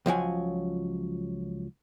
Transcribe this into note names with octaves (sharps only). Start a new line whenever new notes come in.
C#2 F3 F#3 G#5